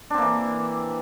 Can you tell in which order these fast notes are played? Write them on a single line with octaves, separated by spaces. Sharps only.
D4 C4 A#3 E3